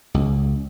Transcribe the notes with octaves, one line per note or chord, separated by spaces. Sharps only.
C#2